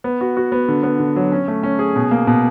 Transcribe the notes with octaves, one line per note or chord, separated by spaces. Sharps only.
B3
F#4
F#4
B3
D3
B3
D3
F#3
C#4
A3
C#4
G#4
B2
A#3
B2